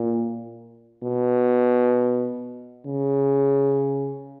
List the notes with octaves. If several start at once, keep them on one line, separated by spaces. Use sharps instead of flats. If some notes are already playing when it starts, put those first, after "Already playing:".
Already playing: A#2
B2
C#3